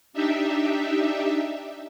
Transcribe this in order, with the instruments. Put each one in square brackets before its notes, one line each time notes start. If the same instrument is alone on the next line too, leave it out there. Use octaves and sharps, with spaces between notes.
[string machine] D4 D#4 G4 E5